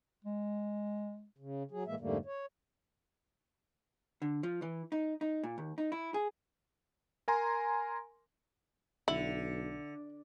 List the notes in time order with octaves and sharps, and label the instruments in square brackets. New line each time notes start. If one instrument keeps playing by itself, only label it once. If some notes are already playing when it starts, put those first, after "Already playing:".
[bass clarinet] G#3
[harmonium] C#3
F#3 G#4
A2 E3 G#3 A#3 E5
F2 G#2 D3 G3 A3 A#3
C#5
[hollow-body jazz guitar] D3
F3
E3
D#4
D#4
A#2
D#2
D#4
E4
G#4
[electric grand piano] A#4 G#5 A#5 C6
[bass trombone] B1 [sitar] D3 [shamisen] E4